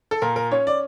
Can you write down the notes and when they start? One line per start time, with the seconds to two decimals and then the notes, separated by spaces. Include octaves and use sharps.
0.11 A4
0.22 A#2 A#4
0.36 A#4
0.51 C#4 C#5
0.67 D5